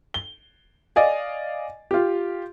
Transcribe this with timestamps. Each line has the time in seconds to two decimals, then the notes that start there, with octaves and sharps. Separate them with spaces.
0.14 G7
0.96 D5 D#5 F5 G#5
1.91 F4 G4